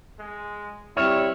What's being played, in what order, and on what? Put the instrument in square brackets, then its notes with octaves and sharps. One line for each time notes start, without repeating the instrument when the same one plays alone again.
[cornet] G#3
[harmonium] G3 C4 [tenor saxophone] E4 [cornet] C#5 [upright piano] F6 E7